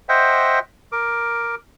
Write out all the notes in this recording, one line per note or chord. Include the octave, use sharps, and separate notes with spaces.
C5 D#5 E5 F#5 G5
A#4 D6